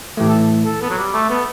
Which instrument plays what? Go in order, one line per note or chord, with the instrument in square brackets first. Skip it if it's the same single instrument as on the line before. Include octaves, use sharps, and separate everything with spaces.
[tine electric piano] A2 E3 A3 [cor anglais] G4
[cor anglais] A4
A4
B3
F#3
G3
A3
B3